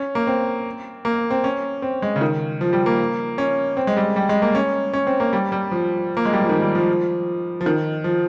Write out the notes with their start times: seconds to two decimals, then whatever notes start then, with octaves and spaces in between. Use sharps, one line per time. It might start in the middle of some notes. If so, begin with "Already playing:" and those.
Already playing: C#4
0.15 A#3
0.27 C4
1.05 A#3
1.31 C4
1.44 C#4
1.82 C4
2.02 G#3
2.16 C#3
2.21 D#3
2.61 F3
2.73 G3
2.86 A#3
3.38 C#4
3.77 C4
3.87 G#3
3.97 G3
4.16 G3
4.29 G#3
4.42 A#3
4.55 C#4
4.93 C#4
5.07 C4
5.20 A#3
5.33 G3
5.52 G3
5.71 F3
6.17 A#3
6.25 G#3
6.33 G3
6.41 F3
6.49 D#3
6.62 G3
6.75 F3
7.61 F3
7.66 D#3
8.04 F3